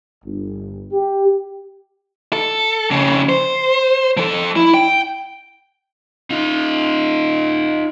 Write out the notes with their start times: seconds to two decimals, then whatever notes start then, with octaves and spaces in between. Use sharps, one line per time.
0.25 G1
0.92 G4
2.33 A4
2.90 F2 C#3
3.29 C5
4.17 F3 A4
4.56 E4
4.74 G5
6.30 D#4 F4